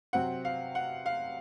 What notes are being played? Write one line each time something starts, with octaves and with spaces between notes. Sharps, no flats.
C3 F#3 C4 F#5
F5
F#5
F5